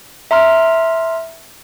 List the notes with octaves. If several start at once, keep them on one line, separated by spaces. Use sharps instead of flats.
E5 A#5 C6 F6